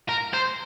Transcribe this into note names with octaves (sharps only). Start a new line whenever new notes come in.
A#4
C5